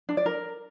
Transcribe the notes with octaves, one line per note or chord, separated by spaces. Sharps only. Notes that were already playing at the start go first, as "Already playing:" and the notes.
D4
D5
A#4